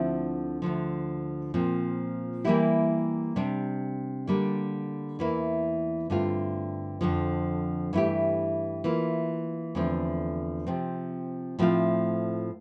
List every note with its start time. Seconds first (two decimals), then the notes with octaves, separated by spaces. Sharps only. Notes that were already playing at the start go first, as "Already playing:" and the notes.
Already playing: D2 D3 F3 C4 E4
0.62 D2 D3 F3
1.54 A#2 F3 C4
2.45 E3 G3 A#3 E4 G4
3.36 C3 G3 D4
4.27 D3 G3 A#3
5.19 E2 E3 A#3 E4
6.10 G2 D3 A3 C4 F4
7.01 F2 D3 F3
7.93 G2 E3 A3 E4 G4
8.84 E3 A#3 F4
9.75 E2 D3 F3 A3 C4
10.67 C3 F3 C4
11.59 A2 F3 A3 C4 F4